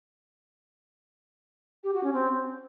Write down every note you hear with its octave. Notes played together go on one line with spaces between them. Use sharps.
G4
F#4
C#4
C4